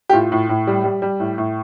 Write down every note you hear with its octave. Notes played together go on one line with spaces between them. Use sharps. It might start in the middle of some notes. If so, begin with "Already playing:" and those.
G4
A2 F4
A2
A2
G3
G3
G3
A2
A2